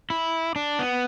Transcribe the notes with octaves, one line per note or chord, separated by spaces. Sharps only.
E4
D4
B3